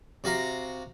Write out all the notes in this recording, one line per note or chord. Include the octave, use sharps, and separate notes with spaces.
C3 F#4 F5 A#5